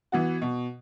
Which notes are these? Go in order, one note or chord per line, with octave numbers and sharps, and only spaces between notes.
E3 B3 F#4
B2